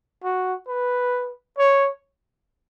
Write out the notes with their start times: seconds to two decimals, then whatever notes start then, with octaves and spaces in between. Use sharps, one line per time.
0.23 F#4
0.68 B4
1.58 C#5